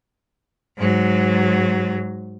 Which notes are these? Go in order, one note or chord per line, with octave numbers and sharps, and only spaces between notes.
G#2 F#3